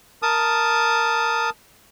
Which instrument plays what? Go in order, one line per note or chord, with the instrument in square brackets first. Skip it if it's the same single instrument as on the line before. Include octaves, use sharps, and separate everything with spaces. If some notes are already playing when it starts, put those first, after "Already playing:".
[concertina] A#4 A5 D#6